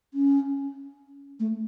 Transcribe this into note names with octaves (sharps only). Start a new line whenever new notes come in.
C#4
A3